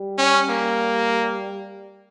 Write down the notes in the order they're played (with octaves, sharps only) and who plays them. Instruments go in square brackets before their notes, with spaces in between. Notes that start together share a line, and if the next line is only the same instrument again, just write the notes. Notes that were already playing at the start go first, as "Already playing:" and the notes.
Already playing: [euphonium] G3
[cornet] C#4
A#3